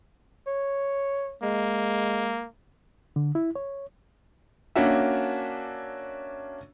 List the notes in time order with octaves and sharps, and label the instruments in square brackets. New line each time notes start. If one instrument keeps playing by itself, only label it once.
[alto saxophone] C#5
[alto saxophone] G#3 [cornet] A#3
[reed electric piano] D3
E4
C#5
[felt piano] A#3 C#4 D4 F#4 E5